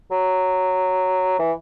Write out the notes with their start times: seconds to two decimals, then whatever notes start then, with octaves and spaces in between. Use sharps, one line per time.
0.11 F#3
1.39 E3